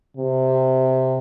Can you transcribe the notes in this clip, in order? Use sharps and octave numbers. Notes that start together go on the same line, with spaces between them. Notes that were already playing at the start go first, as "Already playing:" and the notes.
C3